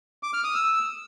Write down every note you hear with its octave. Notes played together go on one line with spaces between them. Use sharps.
D6
F6
D#6
E6